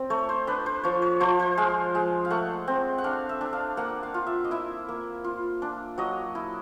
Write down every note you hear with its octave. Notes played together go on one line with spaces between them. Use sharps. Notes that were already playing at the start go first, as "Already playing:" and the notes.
Already playing: C4
A3 C#5
C5
D4 B4
C5
F3 C#5
C#5
F3 C5
C5
G#3 F5
G#3
F5
A3 F#5
C4
F#5
D4 F5
E5
D4
F5
A#3 F#5
F5
F4
E5
D#5
E4 E5
A#3
F4
D4
F#3 D#5
E4